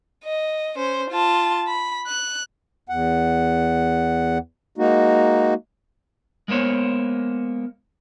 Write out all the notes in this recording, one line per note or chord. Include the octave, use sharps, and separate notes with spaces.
D#5
C#4 C5
F4 A5
B5
F#6
E2 F#5
G#3 A#3 D#4 F#4
G#3 A#3 B3 C5 C#5